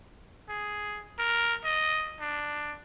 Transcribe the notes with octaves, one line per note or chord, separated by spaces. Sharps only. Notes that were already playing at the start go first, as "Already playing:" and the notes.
G#4
A#4
D#5
D4